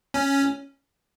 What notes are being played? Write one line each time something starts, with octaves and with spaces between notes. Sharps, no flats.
C#4